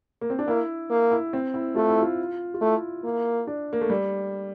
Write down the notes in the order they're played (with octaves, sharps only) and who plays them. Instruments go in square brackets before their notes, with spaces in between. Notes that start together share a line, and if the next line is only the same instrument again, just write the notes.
[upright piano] A#3
C4
D4
[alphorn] A#3 [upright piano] E4
[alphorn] A#3
[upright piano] E4
C4
E4
[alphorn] A3 [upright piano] F4
[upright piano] E4
F4
F4
[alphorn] A3 [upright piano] E4
[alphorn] A#3
[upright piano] D4
A#3
A3
G3